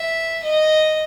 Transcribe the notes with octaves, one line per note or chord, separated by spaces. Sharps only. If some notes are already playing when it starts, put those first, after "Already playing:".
Already playing: E5
D#5